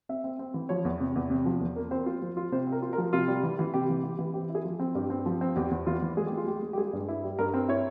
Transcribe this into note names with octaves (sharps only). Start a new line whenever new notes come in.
C4 E5
C4
C4
E3
F3 C#5
E2
C3
E2
C3
F3
E2
A#3
C4 C5
F4
F3
F4
C3 C5
C4
A#4
F4
A#4
F3
C3 F4
G3
E3
E3
C3 G4
E3
E3 G4
E3
C4 G4
E4
G#4
F3
C4
G2 G4
C4
F3
C4
E2 G4
E2
E3 F4
E3
G#3 G#4
G4
G#3 F4
G#3 G4
G#3
G4
G3 G#4
G2
E4
G3
G2 A#4
C4
E4 C#5